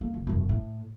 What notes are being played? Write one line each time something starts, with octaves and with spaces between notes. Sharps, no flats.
A#3
F#1
E1 F#2
A2